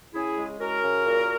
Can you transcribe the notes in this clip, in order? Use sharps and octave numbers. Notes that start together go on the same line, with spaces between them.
C#3 E4 G#4
G#3
C#4 F#4 A#4
C#3
A#2